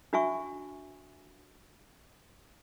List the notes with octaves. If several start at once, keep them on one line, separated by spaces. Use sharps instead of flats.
D4 F#4 E5 G#5 C#6